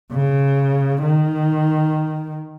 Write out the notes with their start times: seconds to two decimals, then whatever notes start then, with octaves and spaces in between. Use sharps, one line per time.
0.13 C#3
1.02 D#3